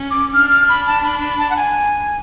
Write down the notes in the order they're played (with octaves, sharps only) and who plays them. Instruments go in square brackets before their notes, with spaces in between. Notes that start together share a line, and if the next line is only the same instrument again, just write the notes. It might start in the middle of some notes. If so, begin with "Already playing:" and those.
Already playing: [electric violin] C#4
[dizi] D6
[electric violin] D4 [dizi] F6
[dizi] F6
B5
A5
B5
B5
A5
F#5
G#5